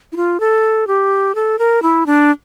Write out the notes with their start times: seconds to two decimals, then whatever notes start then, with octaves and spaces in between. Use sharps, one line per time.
0.12 E4
0.16 F4
0.40 A4
0.87 G4
1.35 A4
1.59 A#4
1.82 E4
2.06 D4